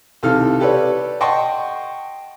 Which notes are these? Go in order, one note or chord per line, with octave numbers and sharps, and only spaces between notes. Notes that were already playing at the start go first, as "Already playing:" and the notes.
C2 D#3 E3 A4 F5 F6
G4 A4 B4 C#5 D5
D#5 F#5 G5 A5 C6 C#6